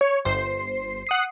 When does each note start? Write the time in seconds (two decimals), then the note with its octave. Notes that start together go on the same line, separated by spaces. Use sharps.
0.01 C#5
0.25 G1 C5 C7
1.07 F#5 D#6 C7